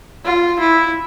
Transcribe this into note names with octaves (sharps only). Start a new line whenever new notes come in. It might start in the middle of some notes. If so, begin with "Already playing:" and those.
F4
E4